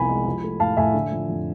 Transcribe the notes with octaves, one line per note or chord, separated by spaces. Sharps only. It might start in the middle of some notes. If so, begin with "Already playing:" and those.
Already playing: C2 C3 F3 B3 G#5 B5
G#3
F3
A3
A2 F5 A5
A2 E5 G#5
D3
F3
F2